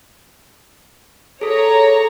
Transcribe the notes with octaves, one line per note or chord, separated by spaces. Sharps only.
G#4 A4 C#5 A#5